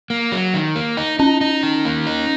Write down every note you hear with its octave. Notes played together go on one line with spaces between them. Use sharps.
A#3
F#3
D#3
A#3
D#4
C#4 D#4
D#4
D#3
A#3
D#4